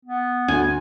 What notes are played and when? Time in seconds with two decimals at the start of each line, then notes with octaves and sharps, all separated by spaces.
0.05 B3
0.48 D2 G#5